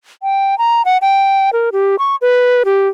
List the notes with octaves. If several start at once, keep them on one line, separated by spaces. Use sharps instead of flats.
G5
A#5
F#5
G5
A#4
G4
C#6
B4
G4